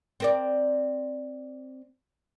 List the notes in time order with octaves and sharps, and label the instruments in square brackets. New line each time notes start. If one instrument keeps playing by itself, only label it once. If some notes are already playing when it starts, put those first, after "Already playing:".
[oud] C4 A#4 D5